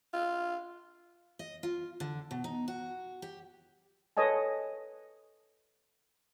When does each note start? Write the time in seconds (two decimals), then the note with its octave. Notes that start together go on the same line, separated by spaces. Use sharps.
0.13 F4
1.39 D#5
1.63 F4
2.00 D3
2.31 B2
2.44 D#4
2.68 F#4
3.22 G4
4.17 A4 B4 C#5 D#5 G#5 A5